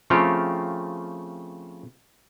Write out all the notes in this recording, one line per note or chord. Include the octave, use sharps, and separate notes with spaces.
C#3 F3 A3 C4 F4 G4